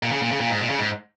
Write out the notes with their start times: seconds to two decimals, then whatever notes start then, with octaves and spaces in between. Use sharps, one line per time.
0.03 A#2
0.12 C#3
0.22 A#2
0.31 C#3
0.40 A#2
0.50 G#2
0.60 A#2
0.69 C#3
0.79 G#2